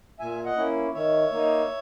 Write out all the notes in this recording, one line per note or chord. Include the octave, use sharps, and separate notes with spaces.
A#2 E5 G#5
D#5 F#5
A#3 C#4 E4
D#3 C#5 E5
A#3 D#4